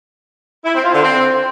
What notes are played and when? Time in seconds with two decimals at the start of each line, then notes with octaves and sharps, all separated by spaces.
0.65 E4
0.74 C4
0.84 F4
0.94 D3
1.03 C4